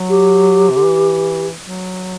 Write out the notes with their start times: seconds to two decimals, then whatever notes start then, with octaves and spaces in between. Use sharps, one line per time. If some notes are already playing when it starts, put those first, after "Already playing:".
Already playing: F#3
0.09 G4
0.70 C3
0.77 D3
0.85 E3
1.62 F#3